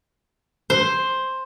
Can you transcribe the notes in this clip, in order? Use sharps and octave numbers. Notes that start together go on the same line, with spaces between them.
C5